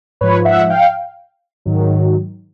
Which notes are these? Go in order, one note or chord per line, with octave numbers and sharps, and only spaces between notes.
G#2 F3 B4 C#5
E5 F#5
F5 G5
G#2 D#3 F#3